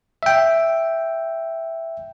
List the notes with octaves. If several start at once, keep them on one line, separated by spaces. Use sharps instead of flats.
E5 G5